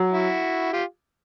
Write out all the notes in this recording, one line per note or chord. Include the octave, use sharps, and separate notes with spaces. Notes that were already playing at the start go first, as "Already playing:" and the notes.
Already playing: F#3
E4 F#4
F4 G4